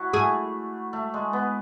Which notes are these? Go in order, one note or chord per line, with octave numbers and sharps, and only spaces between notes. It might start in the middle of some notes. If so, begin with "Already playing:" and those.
Already playing: D4 E4 F#4
A3 G#4
A3
G#3
B3